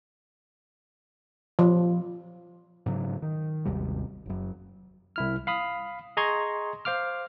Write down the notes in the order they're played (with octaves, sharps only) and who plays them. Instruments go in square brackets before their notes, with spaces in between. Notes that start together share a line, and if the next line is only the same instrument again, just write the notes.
[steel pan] F3
[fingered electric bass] G#2 C#3 F#3
D#3
G#1 D#2 C3 G3
F#1 F#2
[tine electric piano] C2 E4 F6
F5 B5 D#6
G#4 D#5 A#5 C6 C#6 G#6
C5 F5 D6 F6